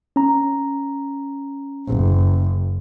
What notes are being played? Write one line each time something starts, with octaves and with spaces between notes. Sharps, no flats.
C#4 A#5
F#1